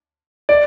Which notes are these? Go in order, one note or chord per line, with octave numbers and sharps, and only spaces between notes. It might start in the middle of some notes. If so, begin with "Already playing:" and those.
D5